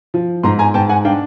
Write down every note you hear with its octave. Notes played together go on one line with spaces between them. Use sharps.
F3
G#2 A#5 C6
G#5 A#5
G#2 G5 A5
F#5 G#5
D4 F5 G5